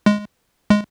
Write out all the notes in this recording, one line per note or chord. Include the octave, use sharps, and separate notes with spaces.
G#3
G#3